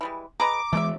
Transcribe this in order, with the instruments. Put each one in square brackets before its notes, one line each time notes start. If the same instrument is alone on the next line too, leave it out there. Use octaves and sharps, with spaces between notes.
[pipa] E3 G3 G#3
[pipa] G#4 B4 D#5 [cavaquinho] A#5 [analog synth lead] D6
[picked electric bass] E3 G#3 [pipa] A3 E5